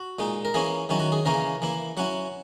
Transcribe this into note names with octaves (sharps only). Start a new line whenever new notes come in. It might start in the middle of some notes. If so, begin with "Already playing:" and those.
Already playing: F#4
A#2 G#3 D#4
A#4
E3 A#3 C#4 E4 G#4
D#3 F#3 C#4 E4
F#4
G#4
C#3 E3 A#3 C#4 A#4
E3 A#3 E4
F#3 C#4 E4 F#5